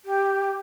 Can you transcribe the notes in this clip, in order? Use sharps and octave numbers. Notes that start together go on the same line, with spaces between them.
G4